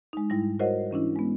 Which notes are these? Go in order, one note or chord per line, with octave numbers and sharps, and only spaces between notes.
G#3 D#4
G#2 G3 E4 A#6
F#4 A#4 C5 C#5 D#5 F#5
E3 C#4 D4 E4
G#3 B3